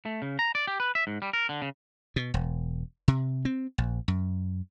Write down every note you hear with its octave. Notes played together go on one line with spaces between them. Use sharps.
A3
C#3
A#5
D5
G4
B4
E5
G#2
G3
A#4
D3
C#3
B2
E1
C3
C4
A#1
F#2